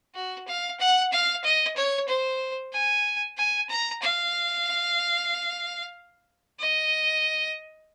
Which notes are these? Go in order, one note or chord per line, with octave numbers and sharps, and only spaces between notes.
F#4
F5
F#5
F5
D#5
C#5
C5
G#5
G#5
A#5
F5
D#5